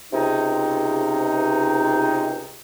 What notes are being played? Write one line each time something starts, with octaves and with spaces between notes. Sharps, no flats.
C#2 C3 D#4